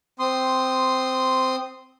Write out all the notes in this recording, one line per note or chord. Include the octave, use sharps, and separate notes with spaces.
C4 C6 D#6